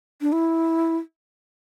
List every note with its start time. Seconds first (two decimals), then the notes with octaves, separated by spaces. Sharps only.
0.21 D4
0.32 E4